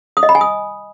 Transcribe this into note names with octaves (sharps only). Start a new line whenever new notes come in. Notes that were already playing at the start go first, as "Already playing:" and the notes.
D#6
D#5
B5
G#5
D#6